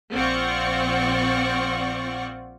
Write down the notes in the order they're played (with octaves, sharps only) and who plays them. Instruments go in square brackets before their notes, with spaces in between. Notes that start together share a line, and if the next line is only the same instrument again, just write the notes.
[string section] A#1 C4 F4 D5 F#5 C#6